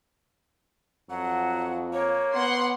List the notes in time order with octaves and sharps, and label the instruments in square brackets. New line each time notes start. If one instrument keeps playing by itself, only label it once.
[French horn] F2 [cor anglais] F#3 [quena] F#5
[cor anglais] A#3 [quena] C#5
[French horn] B3 [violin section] F#5 C6